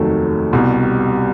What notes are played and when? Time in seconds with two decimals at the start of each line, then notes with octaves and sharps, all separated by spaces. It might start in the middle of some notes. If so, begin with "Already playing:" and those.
Already playing: F1 D#2 D#3 F#3 A3
0.52 C2 B2 G3